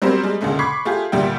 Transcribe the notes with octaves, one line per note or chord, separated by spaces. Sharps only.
F#3 G3 C4 G4 A#4 C5
G3 G#3
D2 A#2 C#3 G#3 A3
B5 C#6 D6 G#6 B6 C7
A3 F4 G4 G#4
D2 A#2 G3 E5 G5